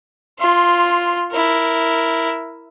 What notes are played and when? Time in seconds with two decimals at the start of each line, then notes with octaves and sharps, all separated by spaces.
0.39 F4 C6
1.31 E4 A#4